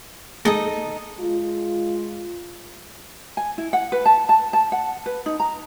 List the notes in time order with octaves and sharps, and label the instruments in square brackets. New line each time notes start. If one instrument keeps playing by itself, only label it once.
[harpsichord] G#3 [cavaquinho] D#4 A4 D#6
[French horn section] G#3 F4
[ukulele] G#5
E4
F#5
B4
A5
A5
A5
F#5
B4
D#4
A#5